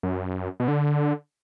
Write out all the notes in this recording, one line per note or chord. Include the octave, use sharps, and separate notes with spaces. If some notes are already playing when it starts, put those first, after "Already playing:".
F#2
B2
D3